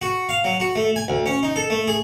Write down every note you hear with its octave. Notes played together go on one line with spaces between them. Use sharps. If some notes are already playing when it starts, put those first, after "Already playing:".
F#4
F5
F#3
F#4
A3
G#5
D2
C#4
D#4
A4
A3
G#4